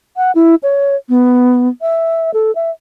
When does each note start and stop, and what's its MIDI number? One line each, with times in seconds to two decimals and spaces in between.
0.17 0.31 78
0.35 0.55 64
0.63 0.96 73
1.09 1.68 59
1.81 2.31 76
2.34 2.54 69
2.55 2.71 76